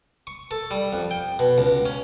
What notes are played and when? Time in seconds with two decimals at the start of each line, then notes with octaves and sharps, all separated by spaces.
0.27 C#6
0.51 A4
0.71 G3
0.93 F2
1.11 G5
1.39 B2
1.58 C#2
1.86 C#4